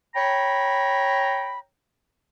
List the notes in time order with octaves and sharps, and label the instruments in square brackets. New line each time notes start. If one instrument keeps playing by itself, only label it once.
[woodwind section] C#5 G5 A#5 B5